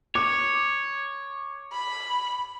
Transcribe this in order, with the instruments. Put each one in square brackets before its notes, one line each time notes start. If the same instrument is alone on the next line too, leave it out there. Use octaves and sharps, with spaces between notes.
[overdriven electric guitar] C#5 [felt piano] D6
[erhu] B5